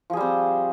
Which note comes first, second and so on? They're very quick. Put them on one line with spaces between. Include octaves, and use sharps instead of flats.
F3 G#4 G3 C4